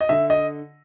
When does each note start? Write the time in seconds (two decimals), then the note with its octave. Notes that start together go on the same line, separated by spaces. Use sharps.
0.01 D#5
0.09 D3 E5
0.30 D#5